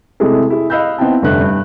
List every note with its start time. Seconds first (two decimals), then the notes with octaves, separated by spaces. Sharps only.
0.20 C3 G#3 A3 E4 G#4 A4
0.50 E4 G#4
0.70 D#5 F5 B5 E6 F#6 G6
0.98 B3 C4 D#4 E4 G5 A5
1.22 F1 G2 D3 E5 F#6
1.41 G2